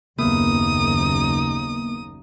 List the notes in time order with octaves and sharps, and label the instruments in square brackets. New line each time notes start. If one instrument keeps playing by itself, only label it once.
[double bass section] F#1 D#2 C#3 [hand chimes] A#3 B3 [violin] D#4 D#6